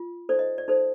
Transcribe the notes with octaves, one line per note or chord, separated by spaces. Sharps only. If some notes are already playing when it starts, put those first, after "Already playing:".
Already playing: F4
D#4 A4 C5 D5
D#5
D5
D#4 A4 C5